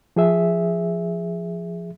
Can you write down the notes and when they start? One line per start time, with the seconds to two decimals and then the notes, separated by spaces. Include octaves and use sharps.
0.16 F3 G#4 E5